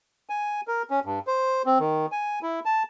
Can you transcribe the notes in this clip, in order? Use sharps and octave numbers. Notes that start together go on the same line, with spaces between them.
G#5
A#4
C#4
G2
C5
C4
D#3
G#5
E4
A5